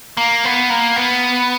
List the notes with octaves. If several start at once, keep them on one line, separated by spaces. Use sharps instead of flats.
A#3
B3
A#3
B3